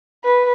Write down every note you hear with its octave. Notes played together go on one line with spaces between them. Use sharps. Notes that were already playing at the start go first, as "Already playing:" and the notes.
B4